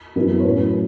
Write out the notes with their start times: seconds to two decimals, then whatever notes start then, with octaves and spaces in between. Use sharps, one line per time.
0.16 F#2 E3 B3 E4 F#4
0.31 A4
0.40 C#5
0.44 A2 F#3 C#4 E4 B4